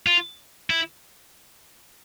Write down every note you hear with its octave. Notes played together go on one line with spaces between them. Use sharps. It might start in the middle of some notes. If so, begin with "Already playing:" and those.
F4
E4